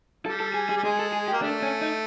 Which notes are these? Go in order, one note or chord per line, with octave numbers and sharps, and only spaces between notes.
G3 A4
A4
G#4
G#4
G3
G#3 G#4
A4
G#4
G4
A#3
A3 D4
C#4
D#4